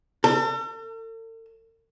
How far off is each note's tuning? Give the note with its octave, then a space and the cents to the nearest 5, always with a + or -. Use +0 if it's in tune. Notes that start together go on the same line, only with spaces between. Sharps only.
A4 +45